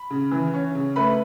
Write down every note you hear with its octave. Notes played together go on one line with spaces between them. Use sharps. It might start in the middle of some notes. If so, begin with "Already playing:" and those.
Already playing: B5
C#3
E3
C#4
C#3
A3 B4 B5